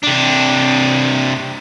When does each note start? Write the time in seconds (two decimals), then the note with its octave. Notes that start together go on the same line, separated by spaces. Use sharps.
0.04 C3 D4